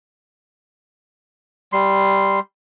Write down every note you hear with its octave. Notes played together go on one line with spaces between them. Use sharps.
G3 C6